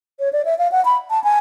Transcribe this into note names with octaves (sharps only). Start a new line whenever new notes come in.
C#5
D5
E5
F5
F#5
B5
A5
G#5